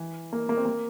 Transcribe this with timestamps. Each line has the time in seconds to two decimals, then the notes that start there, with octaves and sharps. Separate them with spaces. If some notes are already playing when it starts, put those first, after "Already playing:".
Already playing: E3
0.33 A#3
0.49 A#3
0.57 C4
0.66 A#3